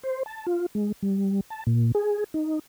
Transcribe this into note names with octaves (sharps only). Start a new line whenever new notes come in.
C5
A5
F4
G#3
G3
A5
A#2
G#4
D#4